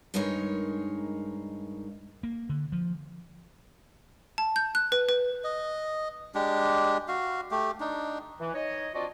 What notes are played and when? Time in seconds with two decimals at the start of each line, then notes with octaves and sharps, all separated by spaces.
0.14 G2 D#3 G#3 D#4 A#4 C#5
2.23 A#3
2.49 D3
2.72 F3
4.38 A5
4.56 G6
4.75 F#6
4.92 B4
5.09 B4
5.44 D#5
6.35 G#3 D4 G4
7.08 F#4 F5
7.51 A3 G4
7.80 D4 D#4
8.40 E3
8.54 D#4 C#5 D#5
8.94 C4 D4 F4 F#4 D5 D#5